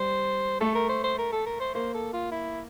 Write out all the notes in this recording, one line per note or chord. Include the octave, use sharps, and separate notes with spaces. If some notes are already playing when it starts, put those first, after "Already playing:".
Already playing: G3 C5
A3 A4
A#4
C5
C5
A#4
A4
A#4
C5
A#3 C5
A4
F4
E4